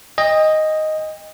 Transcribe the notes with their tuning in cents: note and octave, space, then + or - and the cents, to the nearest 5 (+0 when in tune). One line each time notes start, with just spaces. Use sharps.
D#5 +0 G5 +40